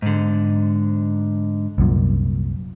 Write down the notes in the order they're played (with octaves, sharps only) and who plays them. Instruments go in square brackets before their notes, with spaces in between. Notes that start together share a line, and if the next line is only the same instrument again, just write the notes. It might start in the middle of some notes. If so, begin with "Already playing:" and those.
[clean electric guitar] G#2 D3
[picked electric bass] C2 F#2 A#2